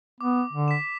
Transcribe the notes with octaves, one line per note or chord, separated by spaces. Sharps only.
B3 D6
D3
B6 E7